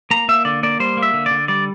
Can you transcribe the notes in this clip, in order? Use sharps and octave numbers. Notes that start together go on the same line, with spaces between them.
A#3 A#5
A#3 E5
D3 D5
A#3 D5
G3 C5
A#3
E5
D3
D3 D5
G3 D5